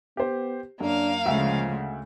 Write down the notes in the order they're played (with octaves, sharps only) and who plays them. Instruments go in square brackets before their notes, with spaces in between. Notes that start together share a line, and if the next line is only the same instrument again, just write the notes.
[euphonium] B3 [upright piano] G4 C5
[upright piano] F#2 [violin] A#3 F5 [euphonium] D4
[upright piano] D2 E5 F#5 [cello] C#3 G#3 [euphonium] F3